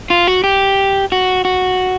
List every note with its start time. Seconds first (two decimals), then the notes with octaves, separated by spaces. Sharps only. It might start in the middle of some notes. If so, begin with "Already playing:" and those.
0.10 F4
0.27 F#4
0.44 G4
1.12 F#4
1.45 F#4